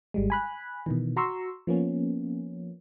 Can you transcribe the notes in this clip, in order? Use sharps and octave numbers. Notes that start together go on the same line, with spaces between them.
G#1 G3 G#3
G#5 B5 F#6
B2 D#3 E3
F#4 A#5 C6 C#6 E6
F3 A#3 B3 C#4